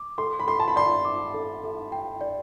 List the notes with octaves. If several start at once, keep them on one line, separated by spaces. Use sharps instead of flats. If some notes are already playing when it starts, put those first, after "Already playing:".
Already playing: D6
A4 C6
B5
A4 C6
A5
B5
D5 C6
D6
A4
A4
G5
D5